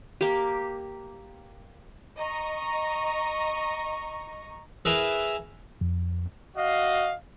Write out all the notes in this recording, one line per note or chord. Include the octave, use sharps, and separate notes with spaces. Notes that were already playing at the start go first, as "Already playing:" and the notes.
A#3 G4
D#5 A#5 C#6
E4 G#4 A#4 B4 E5
F2
F#4 D#5 F5